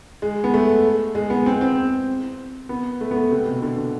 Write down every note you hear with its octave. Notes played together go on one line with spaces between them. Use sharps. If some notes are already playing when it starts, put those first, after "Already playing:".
G#3
B3
A3
G#3
B3
C4
C4
B3
A3
B3
A3
C3
B2
D3